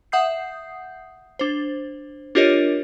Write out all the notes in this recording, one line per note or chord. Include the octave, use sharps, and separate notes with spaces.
E5 F#5 D#6 G6 C7
D4 C5
D4 F4 G4 A#4 C#5 D#5